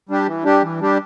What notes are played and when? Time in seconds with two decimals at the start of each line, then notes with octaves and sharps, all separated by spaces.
0.09 G3 D4 G4
0.26 E3
0.44 G3 D4 G4
0.62 E3
0.80 G3 D4 G4